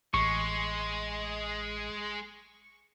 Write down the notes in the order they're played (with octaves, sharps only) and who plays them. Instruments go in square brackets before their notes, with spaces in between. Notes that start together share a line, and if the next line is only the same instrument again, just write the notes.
[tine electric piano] A1 [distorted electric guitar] G#3 [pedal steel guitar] C#6